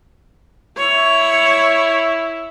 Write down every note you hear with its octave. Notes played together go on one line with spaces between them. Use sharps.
E4 C#5